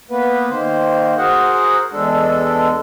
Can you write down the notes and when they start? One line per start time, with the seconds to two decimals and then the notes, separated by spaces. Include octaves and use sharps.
0.10 A#3 B3 B4
0.49 D#3 A#3 C5
1.18 F#4 G#4 A#4 C5 F#5
1.93 E2 G#3 D4 A4